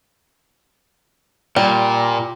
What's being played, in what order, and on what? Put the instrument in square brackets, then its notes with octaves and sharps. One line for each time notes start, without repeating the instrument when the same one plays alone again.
[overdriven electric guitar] A#2 [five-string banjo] G3